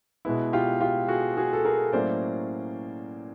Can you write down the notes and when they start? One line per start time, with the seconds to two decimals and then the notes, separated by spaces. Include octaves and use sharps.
0.25 B2 G#3 B3 E4
0.53 F4 G4
0.81 F4 G4
1.08 F#4 G#4
1.37 F#4 G#4
1.53 A4
1.65 G#4 A#4
1.92 A2 F#3 A#3 C#4 C5 D5